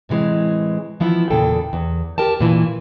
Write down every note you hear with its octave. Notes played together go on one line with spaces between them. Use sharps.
A2 C3 E3 G#3
E3 F3 B3 E4
E2 A#2 C#3 A4 G5
E2
G4 A#4 G5 A5
G2 A#2 E3